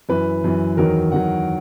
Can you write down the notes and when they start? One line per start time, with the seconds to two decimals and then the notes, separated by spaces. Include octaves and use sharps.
0.09 F#2 E3 B4
0.44 F#2 E3
0.77 E2 D#3 F#3 A#4
1.12 E2 D#3 F#3 F#5